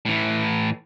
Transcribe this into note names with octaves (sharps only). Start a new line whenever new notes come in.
A2 E3